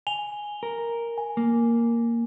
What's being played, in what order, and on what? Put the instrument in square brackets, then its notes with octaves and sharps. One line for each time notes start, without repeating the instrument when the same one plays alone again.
[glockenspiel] G#5 F7 G7
[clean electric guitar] A#4
[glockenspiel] G#5
[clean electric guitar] A#3